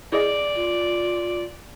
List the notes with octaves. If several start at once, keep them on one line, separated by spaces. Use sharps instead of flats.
E4 G#4 D5 D#5
F4